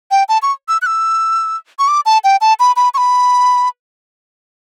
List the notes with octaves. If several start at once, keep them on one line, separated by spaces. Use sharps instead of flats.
G5
A5
C#6
E6
F#6
E6
C#6
D6
A5
G5
A5
B5
B5
C#6
B5